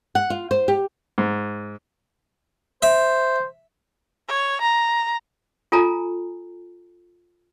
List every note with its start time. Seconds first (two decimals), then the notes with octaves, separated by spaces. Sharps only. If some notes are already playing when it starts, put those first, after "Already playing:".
0.15 F#5
0.30 F4
0.51 C5
0.68 G4
1.18 G#2
2.82 C5 E5
4.28 C#5
4.61 A#5
5.72 F4 A4 G#5 A#5